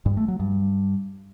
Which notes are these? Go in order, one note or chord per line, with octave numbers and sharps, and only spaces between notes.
G2
A3
F#3
G2